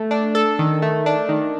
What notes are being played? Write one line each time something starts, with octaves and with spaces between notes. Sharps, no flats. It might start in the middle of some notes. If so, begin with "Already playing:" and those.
Already playing: A3
D4
A4
D#3
A3
D4
D#3